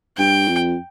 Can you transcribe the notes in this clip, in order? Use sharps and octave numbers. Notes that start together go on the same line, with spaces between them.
G2 G5
F2